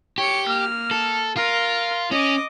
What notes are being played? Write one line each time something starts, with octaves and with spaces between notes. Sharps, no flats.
G4 C#5 C#7
A#3 F6
A4
F4 A#4
C#4 D#5 D6